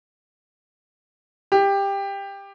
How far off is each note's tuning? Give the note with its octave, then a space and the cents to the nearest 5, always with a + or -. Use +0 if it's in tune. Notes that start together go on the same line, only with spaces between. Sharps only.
G4 +15